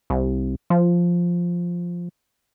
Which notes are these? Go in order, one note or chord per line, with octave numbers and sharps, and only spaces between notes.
C2
F3